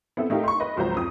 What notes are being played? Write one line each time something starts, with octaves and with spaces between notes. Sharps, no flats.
B3 C4 E4 A4
A3 D#4 E4 G4 A#4 F5
C6 C#6
B4 D#5
G#1 C#2 F3 F#3 C5 A#5
F2 D#6